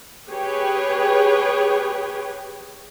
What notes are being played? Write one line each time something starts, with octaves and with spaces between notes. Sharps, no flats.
G4 G#4 B4 C#5 G5